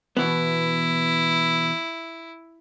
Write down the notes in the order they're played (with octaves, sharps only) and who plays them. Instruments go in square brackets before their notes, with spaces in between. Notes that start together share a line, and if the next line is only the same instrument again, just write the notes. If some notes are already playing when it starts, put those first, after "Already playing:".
[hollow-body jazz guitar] B2 E3 B3 [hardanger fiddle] E4